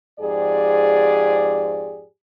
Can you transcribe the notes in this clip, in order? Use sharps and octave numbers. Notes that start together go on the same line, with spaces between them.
F2 G#2 G4 G#4 D5